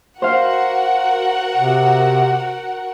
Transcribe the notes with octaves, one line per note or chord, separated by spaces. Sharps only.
F#4 A#4 C5 F5 F#5
C3